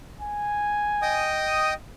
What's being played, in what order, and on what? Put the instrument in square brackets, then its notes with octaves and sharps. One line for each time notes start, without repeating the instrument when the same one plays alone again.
[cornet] G#5
[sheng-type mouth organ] D#5 G5 D#6